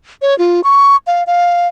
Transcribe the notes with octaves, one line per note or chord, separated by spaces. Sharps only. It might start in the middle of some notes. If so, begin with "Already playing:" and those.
C#5
F4
C#6
F5
F5